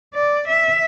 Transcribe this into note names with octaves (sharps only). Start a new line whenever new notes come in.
D5
E5